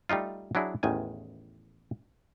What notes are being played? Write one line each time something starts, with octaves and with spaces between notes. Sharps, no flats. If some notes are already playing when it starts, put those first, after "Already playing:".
G3 A3 D#4 F4
F#3 D4 E4 G#4
A1 E2 D#3 G#5